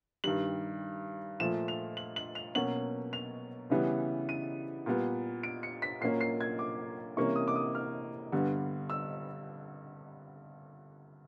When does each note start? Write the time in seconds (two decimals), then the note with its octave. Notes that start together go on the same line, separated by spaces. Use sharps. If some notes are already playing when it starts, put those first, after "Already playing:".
0.24 G2 D#3 G3 F#7
1.40 A#2 F3 A3 E7
1.68 F7
1.97 F#7
2.16 F#7
2.35 F7
2.55 B2 F#3 A#3 C#4 F#7
3.13 F7
3.70 C#3 E3 G3 B3
4.29 D#7
4.86 A#2 G3 B3
5.43 D7
5.63 C#7
5.82 B6
6.01 A#2 F#3 A#3 C#4 C7
6.21 C7
6.41 G#6
6.59 D6
7.17 C3 E3 G3 A#3 C#4 C#6
7.36 D#6
7.48 D6
7.56 D#6
7.75 F6
8.32 G2 D3 G3 B3
8.90 E6